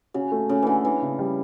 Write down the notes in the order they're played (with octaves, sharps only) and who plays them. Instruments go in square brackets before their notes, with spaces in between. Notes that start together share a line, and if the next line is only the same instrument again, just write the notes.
[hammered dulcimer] C#3 [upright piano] F#4
[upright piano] A3
[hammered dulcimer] C#3 [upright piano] A3
[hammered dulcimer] D3 E3 [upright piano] A3
[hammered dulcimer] E3 [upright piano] D4
[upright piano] C#3
G3